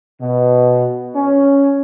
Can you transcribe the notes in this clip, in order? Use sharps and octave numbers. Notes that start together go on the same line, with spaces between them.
B2
C#4